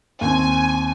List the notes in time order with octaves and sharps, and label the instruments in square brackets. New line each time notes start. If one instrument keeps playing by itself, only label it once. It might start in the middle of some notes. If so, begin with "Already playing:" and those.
[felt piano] D#2 C4 [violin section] G#5